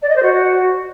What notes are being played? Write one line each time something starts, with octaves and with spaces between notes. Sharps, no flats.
D5
D#5
C5
F#4